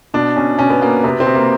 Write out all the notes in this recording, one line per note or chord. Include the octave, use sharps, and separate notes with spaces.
B2 D4
B2 C#4
B2 C#4
B3
B2 A#3
C3 B3
C4
C3
A#3